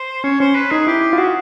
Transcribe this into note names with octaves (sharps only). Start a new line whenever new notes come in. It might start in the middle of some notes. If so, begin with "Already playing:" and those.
Already playing: C5
C#4 C#5
C#4 C5
B4
D#4 G#4
E4 G4
F4
F#4 G#4